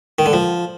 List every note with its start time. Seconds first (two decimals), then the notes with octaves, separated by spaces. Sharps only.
0.19 D#3
0.26 D3
0.33 F3